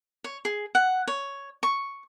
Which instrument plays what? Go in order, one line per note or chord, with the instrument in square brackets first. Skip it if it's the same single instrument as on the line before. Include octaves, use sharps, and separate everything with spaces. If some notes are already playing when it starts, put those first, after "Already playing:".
[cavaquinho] C#5
G#4
F#5
C#5
C#6